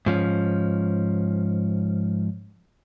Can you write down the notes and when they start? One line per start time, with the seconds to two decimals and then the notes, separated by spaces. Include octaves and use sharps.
0.06 G#2 F3 C#4